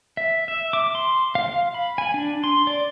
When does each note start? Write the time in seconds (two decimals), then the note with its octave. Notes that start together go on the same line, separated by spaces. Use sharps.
0.17 E5
0.48 E5
0.73 D6
0.95 C6
1.35 F5
1.48 F5
1.74 B5
1.98 G#5
2.14 D4
2.44 C6
2.67 D5